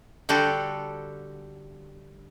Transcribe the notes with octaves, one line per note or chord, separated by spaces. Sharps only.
D3 G3 F#4 G4 A4